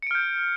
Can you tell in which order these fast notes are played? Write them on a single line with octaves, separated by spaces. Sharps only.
C#7 D7 F6 G6